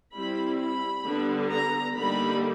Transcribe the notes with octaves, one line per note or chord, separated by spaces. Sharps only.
G3 C4 E4 B5
B5
D3 G3 B3
A#5
D3 G3 A#3 D#4 B5